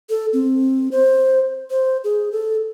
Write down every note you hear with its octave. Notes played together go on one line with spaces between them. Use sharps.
A4
C4
C5
C5
G#4
A4